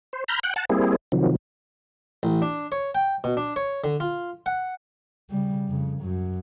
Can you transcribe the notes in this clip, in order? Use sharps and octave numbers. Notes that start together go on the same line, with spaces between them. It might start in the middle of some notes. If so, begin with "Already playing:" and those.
C5
A#5 B5 F6 G6
F#5 G5 F#6
F#5 A5
G3 A#3 C4 E4 G#4
C3 D#3 F3 F#3
A1
D4
C#5
G5
B2
D4
C#5
D3
F4
F#5
C#3 G3
F2 C#3
F#2 F#3